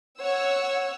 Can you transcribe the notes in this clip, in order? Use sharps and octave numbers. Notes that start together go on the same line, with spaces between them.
C#5 F#5 E6